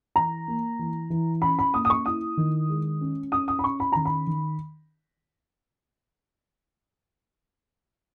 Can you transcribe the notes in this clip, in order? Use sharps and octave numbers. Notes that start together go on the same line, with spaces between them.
E3 A#5
A#3
E3
E3
C#4 B5
B5
A#3 D#6
D#6
C#6
E4 D#6
D#3
G#3
C#4
C#4 D#6
D#6
B5
C#4 C#6
B5
D#3 A#5
B5
D#3